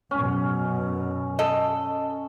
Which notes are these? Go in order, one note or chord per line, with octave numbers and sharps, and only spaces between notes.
F#2 B2 C#4
A4 D#5